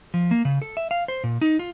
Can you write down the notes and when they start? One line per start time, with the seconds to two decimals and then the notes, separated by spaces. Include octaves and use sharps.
0.14 F3
0.31 A#3
0.45 C#3
0.62 A4
0.77 E5
0.91 F5
1.08 C5
1.24 A#2
1.41 D#4
1.59 F4